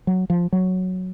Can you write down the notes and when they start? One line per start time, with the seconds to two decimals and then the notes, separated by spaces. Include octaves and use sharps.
0.07 F#3
0.30 F3
0.52 F#3